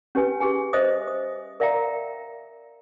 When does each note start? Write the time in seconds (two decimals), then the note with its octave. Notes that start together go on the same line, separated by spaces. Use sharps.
0.15 C#4 G4 B4 G#5
0.40 G4 G#4 G#5
0.73 C5 D#5 E5 D#6
1.08 D#6
1.60 A#4 D5 E5 F5 G5 A#5